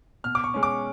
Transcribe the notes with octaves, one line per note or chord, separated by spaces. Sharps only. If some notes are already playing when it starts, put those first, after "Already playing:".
B2 F6
D6
C#6
G#3 C#4
D6